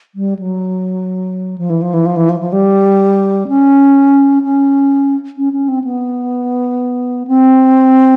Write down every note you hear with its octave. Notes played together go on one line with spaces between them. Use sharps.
G3
F#3
F3
E3
F3
E3
F3
E3
F3
F3
G3
C#4
C#4
C#4
C#4
C4
B3
C4